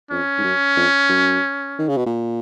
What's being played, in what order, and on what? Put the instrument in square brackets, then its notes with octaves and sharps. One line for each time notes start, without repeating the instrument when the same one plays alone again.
[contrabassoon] F2 [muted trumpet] C#4
[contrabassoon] G#2
F#2
F2
F#2
D#3
C#3
B2
A#2